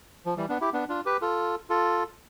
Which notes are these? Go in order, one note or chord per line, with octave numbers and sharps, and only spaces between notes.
F3
E3 G3
B3 D4
E4 G4
B3 D4
D4 F4
G4 B4
F4 A4
F4 A4